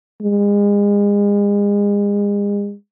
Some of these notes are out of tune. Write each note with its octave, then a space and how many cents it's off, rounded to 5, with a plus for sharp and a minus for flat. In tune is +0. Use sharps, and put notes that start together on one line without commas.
G#3 -35